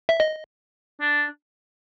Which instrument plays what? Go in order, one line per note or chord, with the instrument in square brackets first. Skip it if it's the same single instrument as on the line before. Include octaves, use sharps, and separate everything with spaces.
[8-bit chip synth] E5
D#5
[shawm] D4